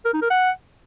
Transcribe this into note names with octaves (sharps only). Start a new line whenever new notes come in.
A#4
D#4
A#4
F#5